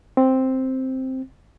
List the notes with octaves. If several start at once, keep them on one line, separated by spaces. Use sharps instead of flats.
C4